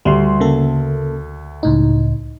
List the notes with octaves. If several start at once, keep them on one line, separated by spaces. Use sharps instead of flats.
D2 G3 C6
C#3 A#3 A4
C#2 A2 D#4